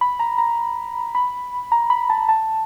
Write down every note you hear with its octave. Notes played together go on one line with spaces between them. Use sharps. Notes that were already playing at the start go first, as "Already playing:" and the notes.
B5
A#5
A#5
B5
A#5
B5
A5
A5